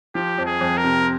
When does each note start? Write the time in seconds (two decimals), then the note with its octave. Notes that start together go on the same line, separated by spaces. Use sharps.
0.15 F3 G4
0.38 F2
0.46 G#4
0.61 F2
0.77 A#4
0.84 C3